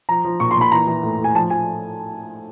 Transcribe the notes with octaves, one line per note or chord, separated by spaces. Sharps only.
F3 A#5
F3
A#2 C#6
C6
A#2
B5
E3 A#5
E3
A2
A2
G#5
F3 A5
F3 G#5